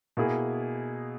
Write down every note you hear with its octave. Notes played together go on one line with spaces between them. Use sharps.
B2 A#3 E4 G#4